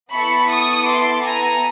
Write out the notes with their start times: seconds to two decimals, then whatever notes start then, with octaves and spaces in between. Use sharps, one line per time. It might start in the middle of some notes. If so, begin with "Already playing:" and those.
0.12 B3 E4 A4 B5 C#6
0.49 C#6 D#6
0.86 C6 D6
1.23 G#5 A#5